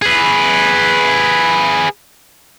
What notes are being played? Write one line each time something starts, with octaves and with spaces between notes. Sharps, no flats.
G#4 B4